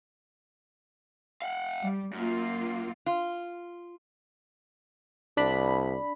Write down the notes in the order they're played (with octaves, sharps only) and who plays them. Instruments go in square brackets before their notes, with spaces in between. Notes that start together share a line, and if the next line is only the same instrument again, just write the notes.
[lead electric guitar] F5 F#5
[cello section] G3
[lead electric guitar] F#2 [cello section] A#3 F4
[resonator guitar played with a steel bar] F4
[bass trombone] C2 [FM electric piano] D4 B5